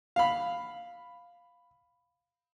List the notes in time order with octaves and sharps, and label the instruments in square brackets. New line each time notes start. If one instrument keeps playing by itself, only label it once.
[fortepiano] F5 B5